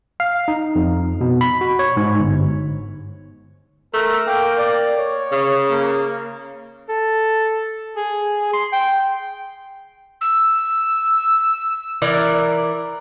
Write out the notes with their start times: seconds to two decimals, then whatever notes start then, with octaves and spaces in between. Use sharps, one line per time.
0.20 F5
0.48 D#4
0.75 F2
1.21 B2
1.41 B5
1.61 F#4
1.79 C#5
1.97 G#2
2.20 G1
3.94 A3 A#4
4.27 A#3 G5
4.58 D5
4.98 C#5
5.32 C#3
5.70 A#3
6.89 A4
7.97 G#4
8.53 C6
8.72 G5
10.21 E6
12.02 E3 A#4 D5